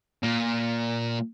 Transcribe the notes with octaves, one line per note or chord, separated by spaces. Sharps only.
A#2